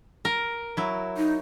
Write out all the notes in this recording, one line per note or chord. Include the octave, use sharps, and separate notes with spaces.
A#4
F#3 E4
D#4